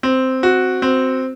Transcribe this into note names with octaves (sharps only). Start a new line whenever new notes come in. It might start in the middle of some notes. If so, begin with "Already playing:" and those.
C4
F#4
C4